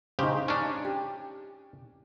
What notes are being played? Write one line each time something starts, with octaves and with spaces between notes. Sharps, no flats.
C#3 D#4 G4 C5
C#4 D4
G4